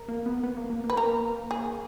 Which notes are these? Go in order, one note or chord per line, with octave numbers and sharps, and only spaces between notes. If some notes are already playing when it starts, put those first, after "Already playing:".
Already playing: A#4
A#3
B3
B3
A#3
A#3
A#3
B4
A#3 A#4
G#4